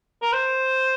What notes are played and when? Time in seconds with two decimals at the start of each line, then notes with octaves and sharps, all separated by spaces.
0.22 A#4
0.33 C5